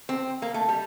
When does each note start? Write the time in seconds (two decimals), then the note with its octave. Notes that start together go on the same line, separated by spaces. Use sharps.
0.09 C4
0.42 A#3
0.54 A3
0.68 G3